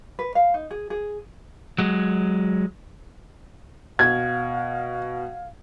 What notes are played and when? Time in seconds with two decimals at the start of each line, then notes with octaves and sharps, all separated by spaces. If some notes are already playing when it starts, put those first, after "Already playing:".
0.19 B4
0.35 F5
0.54 D#4
0.71 G#4
0.90 G#4
1.78 F#3 G#3
3.99 B2 F5 G#6